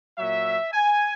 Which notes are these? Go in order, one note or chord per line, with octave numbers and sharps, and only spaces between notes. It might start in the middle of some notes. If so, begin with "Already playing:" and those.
A#2 F#3 E5
G#5